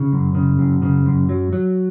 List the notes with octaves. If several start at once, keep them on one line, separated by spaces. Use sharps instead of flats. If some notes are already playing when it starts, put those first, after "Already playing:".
Already playing: C#3
F#2
C#3
F#2
C#3
F#2
F#3
F#3